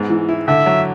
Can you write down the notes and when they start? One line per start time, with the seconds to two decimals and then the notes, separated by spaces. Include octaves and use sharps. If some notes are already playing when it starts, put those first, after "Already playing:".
Already playing: G#2 B3
0.10 E3
0.29 E4
0.48 D3 E5
0.66 F#3